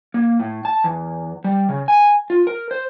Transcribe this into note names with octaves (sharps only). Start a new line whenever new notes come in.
A#3
A2
A5
E2
G3
C#3
G#5
F4
A#4
C5